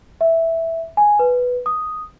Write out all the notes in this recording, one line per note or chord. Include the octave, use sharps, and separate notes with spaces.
E5
G#5
B4
D#6